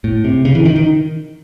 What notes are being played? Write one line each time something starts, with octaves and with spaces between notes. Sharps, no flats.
A2
C3
C#3
E3
D#3
D#3